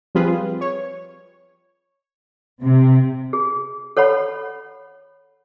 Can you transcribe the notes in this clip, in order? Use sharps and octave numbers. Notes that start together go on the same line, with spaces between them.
F3 G3 C4 F4 G#4 B4
C#5
C3
G#4
A4 C#5 F#5 B5